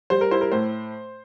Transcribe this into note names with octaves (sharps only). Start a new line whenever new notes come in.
G3 C5
A#4
E4 C5
A#4
A2 C5